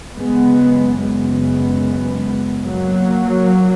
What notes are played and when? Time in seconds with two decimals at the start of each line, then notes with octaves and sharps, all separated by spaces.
0.15 F#1 F#2 C#3 G#3 B3
0.98 G#3 B3
2.65 F#3 A#3